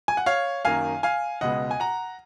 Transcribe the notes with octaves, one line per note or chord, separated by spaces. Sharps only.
G#5
F#5
C#5 F5
F#2 D#3 A#3 F5 G#5
F5 G#5
C#2 B2 G#3 B3 D#5 F#5
G#5
F#5 A#5